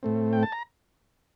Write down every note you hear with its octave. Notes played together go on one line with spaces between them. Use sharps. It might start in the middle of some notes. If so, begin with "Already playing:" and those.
A2 A3 C4
G5
A5
A#5